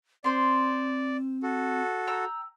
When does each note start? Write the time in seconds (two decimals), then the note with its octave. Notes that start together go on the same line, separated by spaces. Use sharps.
0.24 C4 C5 D5 C6
1.43 F#4 A4
2.07 G5 A#5 E6